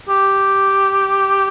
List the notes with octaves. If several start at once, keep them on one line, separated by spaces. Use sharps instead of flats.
G4